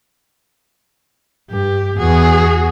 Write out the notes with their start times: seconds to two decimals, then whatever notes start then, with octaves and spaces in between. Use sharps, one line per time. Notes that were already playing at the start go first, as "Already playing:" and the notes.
1.50 G2 G4
1.99 E2 F#4 G#4